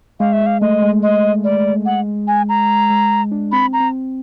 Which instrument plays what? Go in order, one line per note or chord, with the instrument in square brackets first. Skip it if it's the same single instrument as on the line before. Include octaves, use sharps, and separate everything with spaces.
[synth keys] G#3 [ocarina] F5
[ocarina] E5
[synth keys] G#3
[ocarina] F5
[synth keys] A3 [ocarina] D#5
[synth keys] G#3
[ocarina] D#5
D5
F#5
G#5
A#5
[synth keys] G#3
D4
[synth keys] C4 [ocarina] B5
[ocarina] A#5
[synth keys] C4